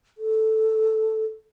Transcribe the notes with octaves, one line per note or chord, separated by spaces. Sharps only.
A4